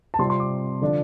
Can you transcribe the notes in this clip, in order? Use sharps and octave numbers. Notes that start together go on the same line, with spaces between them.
A5
C3 G3 C4 F4 C6
C6
D6
D3 F3 D4 F4